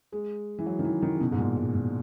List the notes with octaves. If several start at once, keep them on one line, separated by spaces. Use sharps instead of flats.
G#3
E3
F#3
D#3
E3
D#3
C#3
B2
G#2
A#2
G#2
A#2